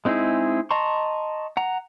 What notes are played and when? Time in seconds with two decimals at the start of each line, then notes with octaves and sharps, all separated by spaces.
0.05 G#3 C4 D#4 E4 G#4
0.71 D#5 A5 A#5 C6 C#6
1.57 F#5 A#5